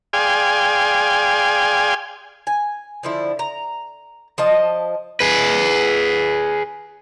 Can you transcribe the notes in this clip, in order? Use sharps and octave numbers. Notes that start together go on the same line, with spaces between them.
G#4 D5 F5 G5 G#5 C6
G#5
D3 F3 E4
A#5
F3 D#5 A5
G#4 B4